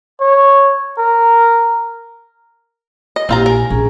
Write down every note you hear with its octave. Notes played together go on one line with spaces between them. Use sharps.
C#5
A#4
D#5
A#1 A#3 C4 E4 F4 G4 A#5
A#4 G#5
A#1 C#4 G#4 A#5